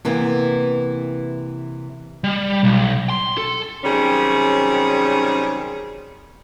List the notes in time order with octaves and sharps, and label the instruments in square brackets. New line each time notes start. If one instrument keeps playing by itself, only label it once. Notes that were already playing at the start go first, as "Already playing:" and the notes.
[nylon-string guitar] C3 E3 A#3 B3
[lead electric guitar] G3
B1
C6
A4
[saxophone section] C3 D#3 F#3 G3 C#4 G#4